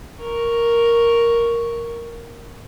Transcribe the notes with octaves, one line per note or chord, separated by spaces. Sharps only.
A#4 C#6